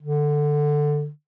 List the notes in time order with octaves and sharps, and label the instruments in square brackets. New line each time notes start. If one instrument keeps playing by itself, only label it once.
[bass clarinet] D3